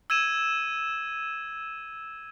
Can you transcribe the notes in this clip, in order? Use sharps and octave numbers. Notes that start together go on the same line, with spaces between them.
E6 G#6 D#7 E7